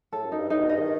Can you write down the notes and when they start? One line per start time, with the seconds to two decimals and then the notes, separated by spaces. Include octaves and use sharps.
0.13 A2 A4
0.25 F#2
0.32 D#4
0.38 G2
0.50 A2 D#4
0.60 B2
0.69 G2 D#5
0.79 D#3